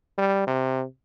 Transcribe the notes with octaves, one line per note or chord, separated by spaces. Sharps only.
G3
C3